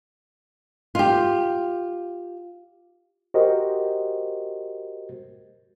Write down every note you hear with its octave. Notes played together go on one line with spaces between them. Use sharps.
F4 G4
F#4 G4 A#4 C5 D#5